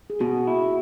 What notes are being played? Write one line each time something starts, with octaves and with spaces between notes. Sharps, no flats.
G#4
B2 F#4
E4